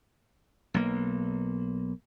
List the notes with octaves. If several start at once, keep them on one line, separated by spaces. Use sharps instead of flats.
B1 A#3